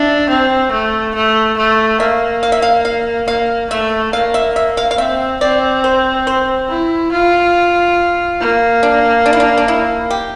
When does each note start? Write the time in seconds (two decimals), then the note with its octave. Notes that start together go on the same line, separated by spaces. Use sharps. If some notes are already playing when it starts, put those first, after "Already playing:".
Already playing: D4 E5
0.29 C4
0.72 A3
1.15 A3
1.57 A3
2.00 A#3 E5
2.43 F5
2.52 E5
2.62 F5
2.85 F5
3.28 A#3 F5
3.71 A3 E5
4.13 A#3 F5
4.34 E5
4.56 E5
4.77 F5
4.91 F5
4.98 C4 E5
5.41 C4 D5
5.84 C5
6.27 C5
6.69 E4
7.12 F4
8.40 A#3
8.83 D4
9.26 D4
9.33 E4
9.40 D4
9.58 D4
9.68 E4
10.11 G4